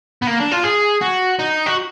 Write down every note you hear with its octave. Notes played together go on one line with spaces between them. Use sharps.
B3
A#3
D4
F4
G#4
F#4
D#4
F#4